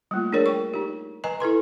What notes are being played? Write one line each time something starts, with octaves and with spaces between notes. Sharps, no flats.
G3 A3 A#3 F4
D4 G#4 A#4 C#5 D5
G5 C#6
D#4 G4
B4 D#5 G#5 A#5
E4 A4 B4 C6